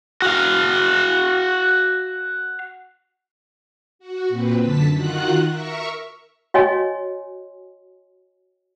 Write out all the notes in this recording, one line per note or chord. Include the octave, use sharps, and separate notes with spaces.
F#4 F5
F#4
A#2 C4 B4
F#2 D3 A5 B6
D#3 F4 F#4 F#5 F#6
A#4 E5 C#6
F#4 C#5 D#5 G#5 C6